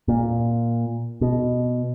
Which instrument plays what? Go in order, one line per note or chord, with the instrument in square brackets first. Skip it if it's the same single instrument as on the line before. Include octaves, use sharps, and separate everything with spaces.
[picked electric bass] A#2
B2